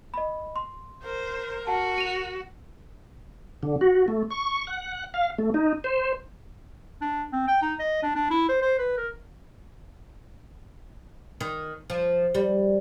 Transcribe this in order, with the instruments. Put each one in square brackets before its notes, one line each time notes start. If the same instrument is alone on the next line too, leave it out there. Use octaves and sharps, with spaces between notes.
[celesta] D#5 B5
C6
[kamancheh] A#4 [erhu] C5
[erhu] F#4 [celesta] F#5 A5
[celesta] D#7 F7
[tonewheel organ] D3
F#4
A3
C#6
F#5
F5
A3
D#4
C5
[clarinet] D4
C4
G5
D#4
D#5
D4
D4
E4
C5
C5
B4
A#4
[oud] D#3
F3
G3